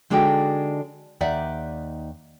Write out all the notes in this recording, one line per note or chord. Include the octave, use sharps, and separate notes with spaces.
D3 G#3 D4 D#4 F#4 G5
D#2 D#4 D5 E5 F#5